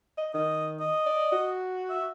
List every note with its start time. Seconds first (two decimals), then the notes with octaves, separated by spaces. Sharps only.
0.18 D#5
0.34 D#3 D#5
0.80 D#5
1.06 D5
1.32 F#4
1.90 E5